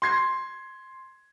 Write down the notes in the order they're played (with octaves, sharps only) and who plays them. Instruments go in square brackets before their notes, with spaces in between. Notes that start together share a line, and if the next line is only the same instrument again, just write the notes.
[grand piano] C6 G#6 C7